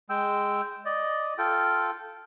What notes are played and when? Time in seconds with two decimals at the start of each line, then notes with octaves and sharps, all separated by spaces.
0.10 G#3 G5 E6
0.85 D5 D#5
1.38 F4 A4 G5